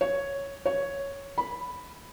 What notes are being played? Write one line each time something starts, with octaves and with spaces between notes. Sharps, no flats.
C#5
C#5
B5